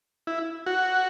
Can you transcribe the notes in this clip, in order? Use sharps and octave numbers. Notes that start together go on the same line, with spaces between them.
E4
F#4